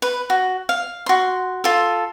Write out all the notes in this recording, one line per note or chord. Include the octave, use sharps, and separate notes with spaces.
B4
F#4
F5
F#4 C6
F4 A4